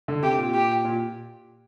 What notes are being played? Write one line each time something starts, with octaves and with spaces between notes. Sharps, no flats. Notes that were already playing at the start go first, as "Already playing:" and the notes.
D3
C3 G4
A#2
G4
A#2